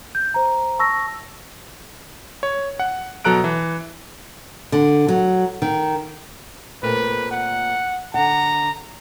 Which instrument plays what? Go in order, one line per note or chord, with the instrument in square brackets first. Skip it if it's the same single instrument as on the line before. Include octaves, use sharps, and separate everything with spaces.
[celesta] G6
C5 A#5
A5 C#6 E6 A#6
[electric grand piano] C#5
F#5
B2 F#3 A4 A#5 F#6 D7
E3
[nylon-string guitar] D3
F#3
D#3
[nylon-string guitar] A#2 A3 C4 [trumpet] B4
[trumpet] F#5
[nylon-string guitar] D3 F#5 [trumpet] A#5